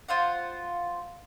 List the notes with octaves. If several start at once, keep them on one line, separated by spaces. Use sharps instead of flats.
F4 C5 F5 F#5